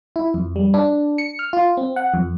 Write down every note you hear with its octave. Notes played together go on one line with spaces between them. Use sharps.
E4
F2
G3
D4
C#7
F6
F4
C4
F#5
F2